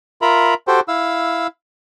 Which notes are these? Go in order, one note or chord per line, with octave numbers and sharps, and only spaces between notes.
F4 A#4 E5 A#5 B5
F#4 G4 A4 C5 G5
E4 F5 E6